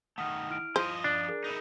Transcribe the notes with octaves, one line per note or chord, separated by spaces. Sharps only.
D#3 A3 F#5 D#6 F6
E4 F6 D7
F3 F4 C5 D#5
D4
G#4 A#4
D#4 E4